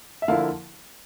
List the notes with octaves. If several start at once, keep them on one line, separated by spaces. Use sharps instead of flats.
E5
D3 F3 A#3 E4 F5